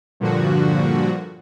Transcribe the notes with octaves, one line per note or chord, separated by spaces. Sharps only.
G2 A#2 D3 F3 F#4